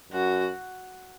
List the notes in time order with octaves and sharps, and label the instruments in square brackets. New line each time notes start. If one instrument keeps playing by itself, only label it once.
[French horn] F#2 [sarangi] F#4